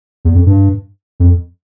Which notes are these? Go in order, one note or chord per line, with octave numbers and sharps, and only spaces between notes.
E2
F2
G2
F2